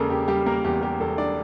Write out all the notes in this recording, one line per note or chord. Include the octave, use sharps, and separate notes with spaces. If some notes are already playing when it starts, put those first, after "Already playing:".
Already playing: E1 C#3 A#3 A4 A#4
G4
G3 G4
A#3 A#4
E2 G4
G4
E1 A4
D4 D5